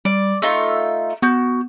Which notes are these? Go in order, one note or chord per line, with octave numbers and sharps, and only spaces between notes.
G3 D5
A3 D#4 F4 E6
B3 F#4 G6